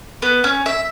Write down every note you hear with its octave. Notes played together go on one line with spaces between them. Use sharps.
B3
C#4
E5